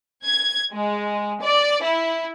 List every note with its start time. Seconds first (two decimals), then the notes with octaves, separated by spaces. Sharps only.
0.24 G#6
0.72 G#3
1.40 D5
1.82 E4